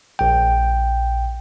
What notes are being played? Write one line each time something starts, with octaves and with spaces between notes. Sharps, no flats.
A#1 G5